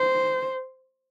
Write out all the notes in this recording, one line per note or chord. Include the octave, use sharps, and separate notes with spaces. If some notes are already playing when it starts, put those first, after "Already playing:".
Already playing: C5